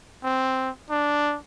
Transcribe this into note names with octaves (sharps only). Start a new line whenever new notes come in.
C4
D4